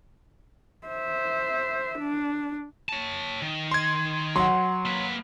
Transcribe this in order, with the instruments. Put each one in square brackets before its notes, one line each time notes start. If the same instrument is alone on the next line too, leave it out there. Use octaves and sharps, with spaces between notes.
[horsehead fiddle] C5 E5
D4
[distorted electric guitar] C#5 A5
D#3
[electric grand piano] C6 G#6
[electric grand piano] F#3 [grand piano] F#5 C6
[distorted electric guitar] A#3 B4